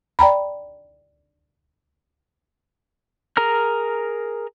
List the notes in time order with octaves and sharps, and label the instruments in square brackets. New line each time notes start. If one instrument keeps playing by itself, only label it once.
[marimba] D5 G5 A#5 B5
[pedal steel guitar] G#4 A#4 A#5 F6